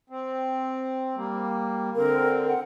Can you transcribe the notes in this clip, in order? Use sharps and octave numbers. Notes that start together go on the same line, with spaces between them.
C4
G3 A#3
D3 C4 A#4
F#5